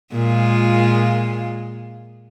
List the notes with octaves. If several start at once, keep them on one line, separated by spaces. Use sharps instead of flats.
A#2 G#3 F4